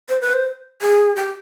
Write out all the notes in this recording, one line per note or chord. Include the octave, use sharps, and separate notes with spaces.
C5
B4
C5
G#4
G4